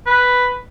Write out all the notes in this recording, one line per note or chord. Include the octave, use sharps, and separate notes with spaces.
B4